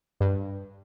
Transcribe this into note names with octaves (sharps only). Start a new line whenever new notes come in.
G2